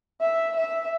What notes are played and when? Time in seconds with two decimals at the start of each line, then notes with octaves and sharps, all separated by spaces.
0.21 E5
0.56 E5